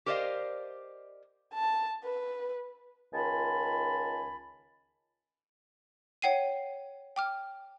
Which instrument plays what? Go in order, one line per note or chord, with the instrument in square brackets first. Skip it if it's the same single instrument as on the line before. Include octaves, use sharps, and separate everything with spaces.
[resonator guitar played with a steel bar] G4 A#4 C5 D5 D#5 F5
[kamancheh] A5
B4
[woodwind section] C#2 D#3 F4 G#5 A5 B5
[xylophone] C#5 F#5 G5 C7 D#7
G5 D6 F6